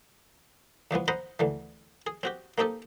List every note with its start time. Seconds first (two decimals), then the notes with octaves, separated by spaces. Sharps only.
0.91 E2 F3 G#3 B3
1.08 C5 D#5 F#5 A#5 B5
1.39 D2 D3 E3
2.07 G#4
2.23 C4 F#4 G4
2.58 A#3 C4 D#4 G4 A4